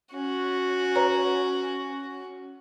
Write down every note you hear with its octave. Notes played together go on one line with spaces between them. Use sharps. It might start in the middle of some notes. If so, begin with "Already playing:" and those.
C#4 F#4
B4 C#5 A#5